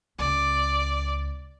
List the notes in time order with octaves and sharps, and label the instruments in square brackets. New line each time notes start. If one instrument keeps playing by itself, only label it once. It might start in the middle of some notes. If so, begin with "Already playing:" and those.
[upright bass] C#2 [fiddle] D5